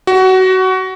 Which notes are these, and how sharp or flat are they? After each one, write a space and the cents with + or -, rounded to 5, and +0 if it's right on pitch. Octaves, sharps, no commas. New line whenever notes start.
F#4 +20